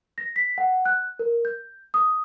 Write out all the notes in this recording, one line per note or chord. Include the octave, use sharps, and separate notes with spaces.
A#6
B6
F#5
F#6
A#4
G6
D#6